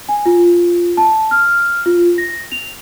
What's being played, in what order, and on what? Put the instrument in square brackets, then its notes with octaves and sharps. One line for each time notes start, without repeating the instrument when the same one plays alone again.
[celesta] G#5
F4
A5
F6
F4
A#6
F7